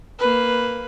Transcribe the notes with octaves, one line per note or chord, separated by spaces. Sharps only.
A#3 B4